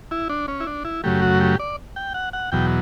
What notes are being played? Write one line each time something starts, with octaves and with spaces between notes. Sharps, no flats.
E4
D4
C#4
E4
D4
E4
F#2 C#3 F#3 A3 G4
F#4
G4
D5
G5
F#5
F#5
E2 B2 F#3 G5